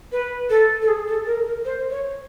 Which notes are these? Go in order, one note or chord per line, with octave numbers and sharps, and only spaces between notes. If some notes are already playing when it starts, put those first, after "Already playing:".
B4
A4
A4
G#4
A4
A#4
A#4
C5
C#5